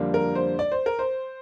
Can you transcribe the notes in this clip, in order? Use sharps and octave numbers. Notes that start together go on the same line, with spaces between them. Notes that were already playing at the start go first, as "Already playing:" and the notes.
Already playing: F2 D3 G3 A#3 D4
A#4
C5
D5
C5
A#4
C5